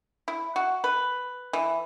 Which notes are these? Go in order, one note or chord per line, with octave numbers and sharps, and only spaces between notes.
E4
F#4
B4
E3